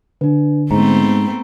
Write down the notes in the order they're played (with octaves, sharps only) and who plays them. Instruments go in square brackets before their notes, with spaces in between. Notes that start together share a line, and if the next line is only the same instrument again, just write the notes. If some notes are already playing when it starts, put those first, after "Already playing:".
[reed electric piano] D3 [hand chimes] D4 B4
[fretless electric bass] G#2 [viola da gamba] A3 B3 C4 [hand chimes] A#5